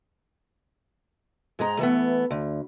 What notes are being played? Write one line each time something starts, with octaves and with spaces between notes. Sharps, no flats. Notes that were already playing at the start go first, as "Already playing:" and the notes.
G#2 G#3 A#5
E3 A3 B3
D2